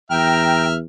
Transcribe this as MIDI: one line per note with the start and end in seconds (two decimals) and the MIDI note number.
0.11 0.83 40
0.11 0.75 76
0.11 0.66 79
0.11 0.71 82
0.11 0.75 89